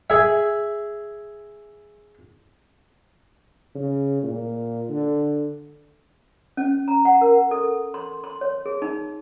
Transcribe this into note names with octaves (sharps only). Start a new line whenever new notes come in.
G#4 E5
C#3
A#2
D3
C#4
A#5
F#5
A#4
A4
C6
C6
C#5
G#4
D#4